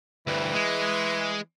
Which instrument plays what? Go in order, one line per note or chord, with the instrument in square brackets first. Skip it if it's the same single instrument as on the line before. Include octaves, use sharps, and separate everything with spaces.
[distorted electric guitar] D2 G2 [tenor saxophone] E3
[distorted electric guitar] G#3